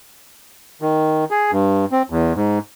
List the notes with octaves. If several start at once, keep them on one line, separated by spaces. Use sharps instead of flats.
D#3
G#4
G2
C4
E2
G#2